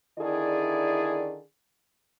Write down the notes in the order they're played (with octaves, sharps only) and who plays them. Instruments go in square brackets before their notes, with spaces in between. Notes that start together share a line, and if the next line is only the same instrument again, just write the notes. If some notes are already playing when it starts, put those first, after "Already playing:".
[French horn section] D3 D#3 E4 G#4 D5